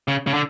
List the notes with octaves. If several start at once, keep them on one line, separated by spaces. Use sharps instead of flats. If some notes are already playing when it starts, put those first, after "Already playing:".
C#3
C#3
D3